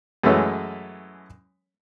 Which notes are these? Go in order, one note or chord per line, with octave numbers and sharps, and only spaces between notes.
F#2 E3 G#3 A3 C#4